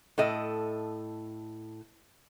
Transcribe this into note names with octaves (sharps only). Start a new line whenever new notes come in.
A2 A4 D#5